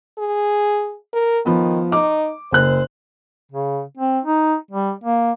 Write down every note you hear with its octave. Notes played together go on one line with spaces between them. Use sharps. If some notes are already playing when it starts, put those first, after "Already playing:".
G#4
A#4
D#3 F3 B3
D#4 D6
F#1 C5 F#6
C#3
C4
D#4
G3
A#3